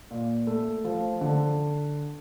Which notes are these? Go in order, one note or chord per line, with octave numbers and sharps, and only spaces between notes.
A#2
A3
F3
D3